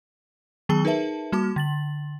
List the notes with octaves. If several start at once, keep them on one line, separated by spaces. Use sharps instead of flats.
D#3 F#3 B3 G#4 A5 G7
D#4 G#4 A#4 B4 E5 A5
G3 A#3 F#4 A5 D6
D3 A6 F#7